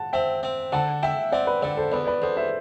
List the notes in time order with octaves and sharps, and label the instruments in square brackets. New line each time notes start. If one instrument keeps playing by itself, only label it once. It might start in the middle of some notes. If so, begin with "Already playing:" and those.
Already playing: [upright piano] F#5 A5
[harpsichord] C4 [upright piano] E5 G5
[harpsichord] C4
[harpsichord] D3 [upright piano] F#5 A5
[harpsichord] E4 [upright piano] E5 G5
[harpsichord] C4 [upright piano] D5 F#5
[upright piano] B4 D5
[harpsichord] D3 [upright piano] B4 D5
[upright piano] A4 C5
[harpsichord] E2 [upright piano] B4 D5
[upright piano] B4 D5
[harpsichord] E2 [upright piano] A4 C5
[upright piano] C5 E5